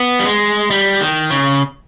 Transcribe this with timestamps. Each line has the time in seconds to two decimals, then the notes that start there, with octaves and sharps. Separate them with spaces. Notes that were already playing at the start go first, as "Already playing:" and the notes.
Already playing: B3
0.19 G3
0.26 G#3
0.70 G3
1.00 D#3
1.30 C#3